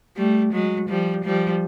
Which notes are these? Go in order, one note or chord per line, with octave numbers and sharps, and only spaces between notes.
G3 A3
F#3 G#3
F3 G3
F3 G3